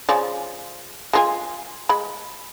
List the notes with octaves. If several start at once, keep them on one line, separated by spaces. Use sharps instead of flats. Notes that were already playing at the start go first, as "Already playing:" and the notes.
C#3 F3 D5
G#3 F4 G#5
G#3 B5